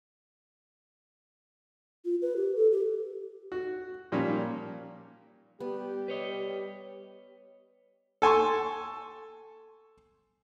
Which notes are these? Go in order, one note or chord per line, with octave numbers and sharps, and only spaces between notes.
F4
B4
G4
A4
G4
F#4
A#2 F3 G3 A#3 C#4
G3 B3 G4
B4 C#5 D#5
A4 G#5 C6 C#6